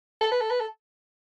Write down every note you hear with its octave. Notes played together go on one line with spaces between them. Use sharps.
A4
B4
A4
B4
A4